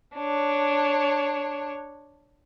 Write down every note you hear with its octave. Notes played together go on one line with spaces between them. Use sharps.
D4 C#5